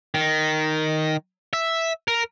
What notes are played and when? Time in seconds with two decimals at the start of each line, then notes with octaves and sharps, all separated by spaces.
0.14 D#3
1.53 E5
2.08 A#4